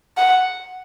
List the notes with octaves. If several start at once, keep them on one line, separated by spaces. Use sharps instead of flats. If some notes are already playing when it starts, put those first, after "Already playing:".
F#5